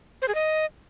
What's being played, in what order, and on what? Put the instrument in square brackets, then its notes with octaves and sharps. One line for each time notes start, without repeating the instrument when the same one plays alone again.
[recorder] C5
G#4
D#5